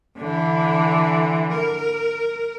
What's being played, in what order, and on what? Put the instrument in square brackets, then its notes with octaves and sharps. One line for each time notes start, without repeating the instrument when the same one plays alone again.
[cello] D3 E3
A#4